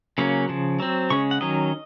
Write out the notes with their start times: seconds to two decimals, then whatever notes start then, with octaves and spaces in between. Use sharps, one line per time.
0.18 C#3 F#3 A#3 C#4
0.49 C#3 F3
0.80 F#3 C4
1.10 C#3 G#3 C#4 C#6
1.31 F#5
1.41 D#3 F#3 C#4 D#5